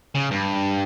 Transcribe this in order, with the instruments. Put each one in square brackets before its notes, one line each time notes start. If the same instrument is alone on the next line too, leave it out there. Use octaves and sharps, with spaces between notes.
[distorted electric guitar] C#3
G2